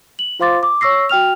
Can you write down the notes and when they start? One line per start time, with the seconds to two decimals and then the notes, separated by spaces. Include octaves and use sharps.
0.19 F#7
0.40 F4 C5 F5 C6 D6 A6
0.63 D6
0.81 C#5 C#6 E6 A#6 C7
1.09 F#4 G5 F6 F7